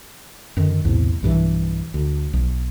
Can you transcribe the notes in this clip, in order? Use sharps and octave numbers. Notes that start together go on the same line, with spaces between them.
F#2 D3 D#3
B1 E2 A2 C3
B1 G2 D#3 E3
D2
B1